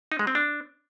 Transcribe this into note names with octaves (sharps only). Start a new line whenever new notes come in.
D#4
G#3
C4
D4